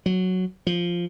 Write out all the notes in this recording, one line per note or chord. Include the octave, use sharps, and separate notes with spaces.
F#3
F3